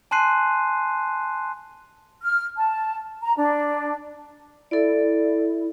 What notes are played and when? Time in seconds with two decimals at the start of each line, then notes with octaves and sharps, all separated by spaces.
0.11 G#5 A5 C6 F#6 C7 D#7
2.23 F6
2.56 A5
3.22 A#5
3.37 D4
4.71 E4 A4 D5